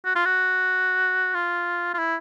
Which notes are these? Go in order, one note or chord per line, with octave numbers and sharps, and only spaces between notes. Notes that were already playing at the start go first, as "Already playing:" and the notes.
F#4
F4
F#4
F4
F4
E4